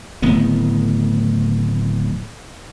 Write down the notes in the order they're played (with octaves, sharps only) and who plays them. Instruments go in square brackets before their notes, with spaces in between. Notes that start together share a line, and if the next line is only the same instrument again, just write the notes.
[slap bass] D1 A2 D#3 B3